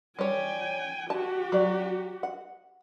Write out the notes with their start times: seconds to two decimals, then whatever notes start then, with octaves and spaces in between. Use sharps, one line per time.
0.19 G3 C#5 G5 G#5
1.10 F#4 G4 A5
1.52 F#3 D5
2.23 F#5